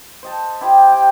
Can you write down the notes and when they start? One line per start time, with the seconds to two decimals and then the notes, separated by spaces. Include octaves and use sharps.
0.23 C5 D#5 A5
0.61 E4 G4 C5
0.92 G5